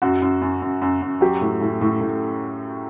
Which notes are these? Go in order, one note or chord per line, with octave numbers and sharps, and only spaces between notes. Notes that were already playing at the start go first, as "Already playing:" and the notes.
F#2 F#4
F#2
F#2
F#2
F#2
F#2
F#3 G4
A2
A2
A2
A2